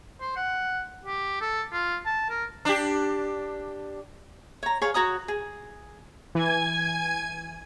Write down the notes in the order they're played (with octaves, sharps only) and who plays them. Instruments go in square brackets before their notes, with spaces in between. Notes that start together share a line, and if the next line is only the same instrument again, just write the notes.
[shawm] C5
F#5
G4
A4
F4
A5
A#4
[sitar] D4 G4
[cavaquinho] C#5 A#5
G#4 C#5 F5 C#6
F#4 C#5 A#5 D#6
G#4
[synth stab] E3 [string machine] G#5 G#6